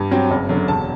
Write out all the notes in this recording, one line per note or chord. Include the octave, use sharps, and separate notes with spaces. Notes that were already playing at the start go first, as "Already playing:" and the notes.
Already playing: G2
F#3 C4
F#1
F#2 D3
E1 A5